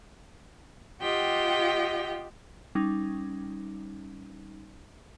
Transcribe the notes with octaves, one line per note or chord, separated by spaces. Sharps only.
F4 G4 D#5 F#5 G5
G3 C#4 D#4